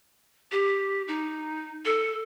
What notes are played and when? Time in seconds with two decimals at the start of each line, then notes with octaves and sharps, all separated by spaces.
0.52 G4
1.08 D#4
1.85 A4